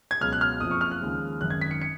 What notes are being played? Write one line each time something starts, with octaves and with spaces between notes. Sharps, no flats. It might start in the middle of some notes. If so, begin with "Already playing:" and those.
G#6
C#2 B2 F#3 F6
F#6
F6
F#1 F2 F3 D#6
C#6
F6
F#6
D#2 C#3 F3 G#3
G#1 F#2 D#3 F#6
G#6
B6
C#7
C#7